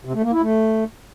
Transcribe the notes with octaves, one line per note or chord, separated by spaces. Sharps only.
C3
A3
A#3
E4
A3